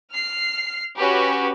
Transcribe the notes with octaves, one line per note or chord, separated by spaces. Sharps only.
F6 C7
C#4 F#4 G4 B4